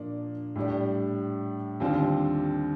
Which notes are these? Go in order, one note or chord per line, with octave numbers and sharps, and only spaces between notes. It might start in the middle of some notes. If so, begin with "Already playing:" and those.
Already playing: A#2 F3 A#3 D4
A2 G3 D4
D#2 D3 G3 C4 F4